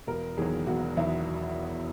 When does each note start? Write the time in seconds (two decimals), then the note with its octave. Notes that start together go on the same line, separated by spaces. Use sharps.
0.07 E1 A#4
0.37 E2 D#3 F#3 G#4
0.67 E1 F#4
0.97 E2 D#3 F#3 E4